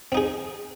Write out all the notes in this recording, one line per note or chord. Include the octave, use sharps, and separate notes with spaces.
C4 D#4 G#4